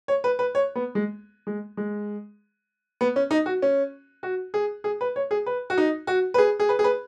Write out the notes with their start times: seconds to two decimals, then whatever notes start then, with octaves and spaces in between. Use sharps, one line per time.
0.08 C#5
0.24 B4
0.39 B4
0.55 C#5
0.75 B3
0.95 G#3
1.47 G#3
1.77 G#3
3.01 B3
3.16 C#4
3.31 D#4
3.46 F#4
3.62 C#4
4.23 F#4
4.54 G#4
4.84 G#4
5.01 B4
5.16 C#5
5.31 G#4
5.46 B4
5.70 F#4
5.78 D#4
6.07 F#4
6.34 B4
6.38 G#4
6.60 G#4
6.69 B4
6.79 G#4
6.84 B4